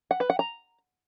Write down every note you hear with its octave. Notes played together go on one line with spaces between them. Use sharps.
F#5
B4
F#5
A#5